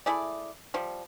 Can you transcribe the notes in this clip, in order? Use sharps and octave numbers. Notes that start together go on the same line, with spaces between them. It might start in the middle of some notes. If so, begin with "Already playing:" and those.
A3 E4 G#4 D5
F3 G3